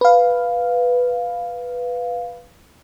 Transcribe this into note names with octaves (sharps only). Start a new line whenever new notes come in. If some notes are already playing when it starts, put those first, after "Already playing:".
B4 F5